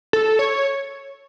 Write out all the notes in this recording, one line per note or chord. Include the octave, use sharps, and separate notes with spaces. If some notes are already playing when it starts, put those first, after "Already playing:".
A4
C#5